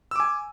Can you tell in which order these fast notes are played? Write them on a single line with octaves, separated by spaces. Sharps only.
E6 D6 G#5